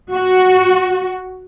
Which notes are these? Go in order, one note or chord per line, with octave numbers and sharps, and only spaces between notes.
F#4